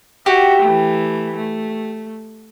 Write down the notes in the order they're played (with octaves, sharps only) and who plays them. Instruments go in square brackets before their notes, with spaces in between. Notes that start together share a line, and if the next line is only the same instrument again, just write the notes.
[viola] F#4 E5 [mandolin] G4
[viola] E3 A3
A3